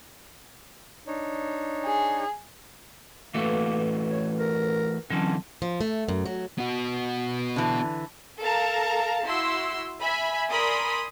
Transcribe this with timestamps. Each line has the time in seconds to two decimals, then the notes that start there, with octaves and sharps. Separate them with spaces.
1.07 D4 D#4 C#5
1.85 G#4
3.35 E3 A3 A#3 F#4 A4 B4
4.10 C#5
4.39 A#4
5.10 D3 E3 F#3 C4 C#4 A5
5.62 F3
5.81 A3
6.09 F#2
6.26 F#3
6.58 B3 F#4
7.56 D3 E3
8.40 A4 A#4 F5 A5 A#5
9.25 E4 F#4 C6 E6
10.01 E5 G#5 B5
10.50 A#4 D5 G#5 B5 C6 D#6